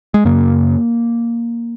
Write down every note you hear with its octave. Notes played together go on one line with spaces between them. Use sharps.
G#3
F#2 C#3 A#3